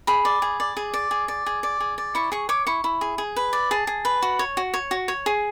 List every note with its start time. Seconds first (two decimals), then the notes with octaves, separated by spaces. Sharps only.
0.07 G#4 B5
0.25 D5
0.42 G#4
0.60 D5
0.77 G#4
0.94 D5
1.11 G#4
1.28 D5
1.46 G#4
1.63 D5
1.80 G#4
1.98 D5
2.15 E4 C#6
2.32 G#4 C#6
2.49 C#5 D6
2.67 E4 C#6
2.84 E4
3.01 G#4
3.18 G#4
3.36 B4
3.53 D5
3.71 G#4 A5
3.87 G#4
4.05 B4
4.22 F#4
4.39 C#5
4.57 F#4
4.74 C#5
4.91 F#4
5.08 C#5
5.26 G#4